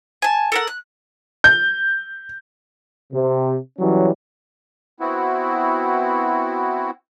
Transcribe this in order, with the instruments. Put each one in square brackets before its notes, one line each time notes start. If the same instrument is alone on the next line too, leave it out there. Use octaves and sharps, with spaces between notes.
[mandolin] G#5 A5
A4 A#4 F#5
F#6
[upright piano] G6
[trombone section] C3
E3 F#3 G3 C#4
[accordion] B3 C4 E4 F#4